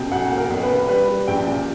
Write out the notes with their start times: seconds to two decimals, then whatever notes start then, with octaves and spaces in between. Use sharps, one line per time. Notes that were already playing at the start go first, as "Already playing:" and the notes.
Already playing: B1 B2 G5
0.12 B1 F#5
0.31 A#3
0.38 A#4
0.50 B1
0.63 B4
0.70 A#3
0.89 G3 B4
1.08 G3
1.27 A#1 G5
1.47 A#2